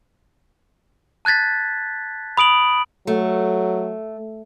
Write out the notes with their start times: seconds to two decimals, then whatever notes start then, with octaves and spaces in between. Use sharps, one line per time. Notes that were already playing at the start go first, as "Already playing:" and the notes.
1.25 A5 F#6 G#6 A6 B6
2.37 B5 D#6 D7 F#7
3.07 F#3 A3